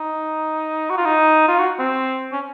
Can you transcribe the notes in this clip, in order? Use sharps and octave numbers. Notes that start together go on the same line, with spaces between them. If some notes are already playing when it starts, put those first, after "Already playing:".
Already playing: D#4
F#4
F4
D#4
F4
F#4
C4
C#4